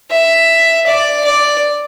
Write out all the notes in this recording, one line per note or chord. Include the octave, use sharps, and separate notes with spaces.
E5
D5
D5